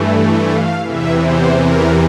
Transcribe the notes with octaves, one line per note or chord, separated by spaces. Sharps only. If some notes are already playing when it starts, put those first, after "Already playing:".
Already playing: G2 E3 A3
F5
E2 C3 E3 E5
C5
A#4